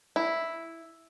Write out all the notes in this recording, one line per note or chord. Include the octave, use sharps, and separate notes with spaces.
E4